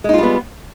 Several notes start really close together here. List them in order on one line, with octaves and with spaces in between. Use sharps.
G#3 D#4 F4 G3 B3